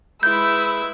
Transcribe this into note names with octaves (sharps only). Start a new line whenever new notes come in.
G#3 E4 B4 E6 G6